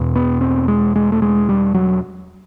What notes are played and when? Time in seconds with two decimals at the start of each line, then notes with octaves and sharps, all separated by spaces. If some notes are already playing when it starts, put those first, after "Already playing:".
Already playing: E2 B2
0.16 B3
0.41 C4
0.68 G#3
0.96 G#3
1.12 A3
1.22 G#3
1.49 G3
1.75 F#3